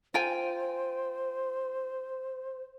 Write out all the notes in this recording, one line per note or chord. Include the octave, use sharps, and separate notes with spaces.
F4 C5 G5 G#5